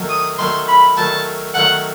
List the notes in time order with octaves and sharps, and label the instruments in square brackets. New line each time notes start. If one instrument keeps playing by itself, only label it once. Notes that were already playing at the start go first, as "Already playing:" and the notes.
Already playing: [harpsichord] D#3 F#3 A3
[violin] D#6
[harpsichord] D#3 F#3 A3 [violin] C6
[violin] B5
[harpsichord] D#3 F#3 A3 [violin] A5
[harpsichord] D#3 F#3 A3 [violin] F#5